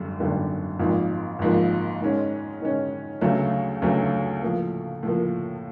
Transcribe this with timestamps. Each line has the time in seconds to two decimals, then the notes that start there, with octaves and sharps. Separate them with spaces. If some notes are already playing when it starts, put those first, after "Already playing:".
Already playing: G#1 F#2 D3 G3
0.19 G#1 F#2 D3 G3 A#3
0.79 G#1 G#2 F3 A#3
1.39 G#1 G#2 F3 A#3
2.01 G#2 D#3 G#3 C#4
2.61 G#2 D#3 G#3 C#4
3.21 D2 C#3 F#3 A3
3.82 D2 C#3 F#3 A3
4.42 A2 F3 A#3
5.03 A2 F3 A#3